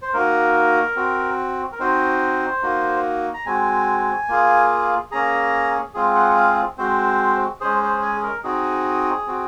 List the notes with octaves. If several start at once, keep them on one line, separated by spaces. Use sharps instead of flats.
C5
A#3 D#4 F#4 A#4
C4 F#4
A#4
C4 D#4 F#4 C5
A#3 D#4 F#4
A#5
G#3 C4 F#4 G#5
A#3 F4 G#4
A#3 C#4 G#4 A#5
G#3 C4 F4 G#4
F#5
F5
G#3 C4 F#4 C5
G#3 C#4 G#4 C5
C5
G#5
G#4
A#4
C4 D#4 F#4 G#4
C4 F#4